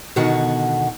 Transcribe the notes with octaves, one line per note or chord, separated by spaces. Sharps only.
B2 D3 D#3 F#4 F#5